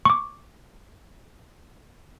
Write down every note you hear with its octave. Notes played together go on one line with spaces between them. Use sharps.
C#6 D6